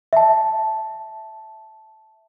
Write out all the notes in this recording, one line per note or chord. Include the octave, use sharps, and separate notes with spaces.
E5 A5